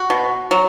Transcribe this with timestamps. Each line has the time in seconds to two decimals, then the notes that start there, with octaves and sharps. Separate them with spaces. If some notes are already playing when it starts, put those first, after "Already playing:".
Already playing: F#4
0.10 B2
0.51 F#3